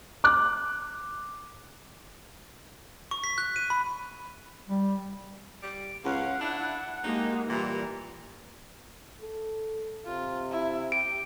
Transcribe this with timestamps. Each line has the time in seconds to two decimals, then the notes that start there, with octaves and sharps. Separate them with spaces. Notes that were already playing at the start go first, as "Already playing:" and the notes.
0.24 D6 F#6
3.11 C#6
3.24 B6
3.38 F#6
3.56 D#7
3.70 B5
4.67 G3
5.62 G3 D7
6.05 C#2 C#4 F5 F#5
6.41 D4 E4
7.04 G#3 A#3 D#4 G4
7.49 A#2 E3 G3 A#5
9.22 A4
10.06 C3 F4
10.51 E4
10.92 G4 D7